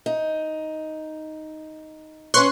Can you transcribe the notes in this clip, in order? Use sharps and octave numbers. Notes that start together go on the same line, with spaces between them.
D#4
C#4 B4 C#5 C6 C#6 F#6